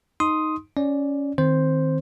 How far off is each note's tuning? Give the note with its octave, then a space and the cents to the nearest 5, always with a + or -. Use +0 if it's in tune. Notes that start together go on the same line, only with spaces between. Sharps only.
D#4 +0 C6 +0 D#6 +5
C#4 +10 D5 +0
D#3 +0 C4 +0 C5 +0